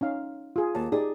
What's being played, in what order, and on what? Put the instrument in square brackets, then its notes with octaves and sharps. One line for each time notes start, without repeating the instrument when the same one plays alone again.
[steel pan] C#4 D#4 F5
F4 G#4
[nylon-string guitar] D#2 [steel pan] A5
[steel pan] D#4 G4 D5 [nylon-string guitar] G#4